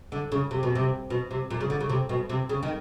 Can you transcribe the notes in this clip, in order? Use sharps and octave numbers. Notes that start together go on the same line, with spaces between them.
D3
C#3
C3
B2
C3
B2
C3
A#2
C#3
D3
C#3
C3
B2
C3
C#3
D#3